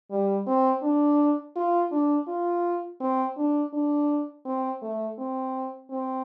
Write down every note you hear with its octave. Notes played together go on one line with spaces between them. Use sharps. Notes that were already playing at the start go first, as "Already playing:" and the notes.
G3
C4
D4
F4
D4
F4
C4
D4
D4
C4
A3
C4
C4